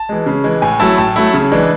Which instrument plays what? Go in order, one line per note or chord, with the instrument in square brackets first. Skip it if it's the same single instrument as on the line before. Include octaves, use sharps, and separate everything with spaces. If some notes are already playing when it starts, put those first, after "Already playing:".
Already playing: [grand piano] A5
E3 G#3
C#3
E3 G#3
A2 G#5
F#3 A3 E4 A5
A2 A5
F#3 A3 E4
C#3
E3 G#3 D4